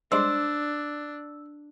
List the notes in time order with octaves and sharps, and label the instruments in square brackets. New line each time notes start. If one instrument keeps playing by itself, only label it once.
[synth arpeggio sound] G3 G#3 C6 [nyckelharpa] D4 [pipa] C5 D5 [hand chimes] E6